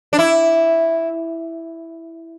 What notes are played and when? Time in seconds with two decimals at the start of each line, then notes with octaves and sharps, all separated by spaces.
0.13 D4
0.19 E4